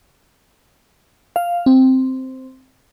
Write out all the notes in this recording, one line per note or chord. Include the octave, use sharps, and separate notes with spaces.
F5
C4